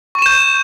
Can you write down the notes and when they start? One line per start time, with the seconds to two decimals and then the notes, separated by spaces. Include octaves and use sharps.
0.15 C#6
0.19 D#7
0.22 E7
0.26 G6